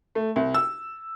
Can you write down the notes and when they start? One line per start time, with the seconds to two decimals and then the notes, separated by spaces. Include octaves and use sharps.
0.15 A3
0.36 C2
0.54 E6